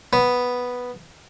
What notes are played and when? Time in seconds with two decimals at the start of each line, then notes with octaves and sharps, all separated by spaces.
0.13 B3